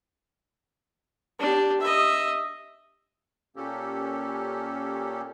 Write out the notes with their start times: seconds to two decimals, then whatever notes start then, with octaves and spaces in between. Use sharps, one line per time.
1.39 D4 G4
1.81 D#5 E5
3.56 A#2 A#3 C#4 G4 A4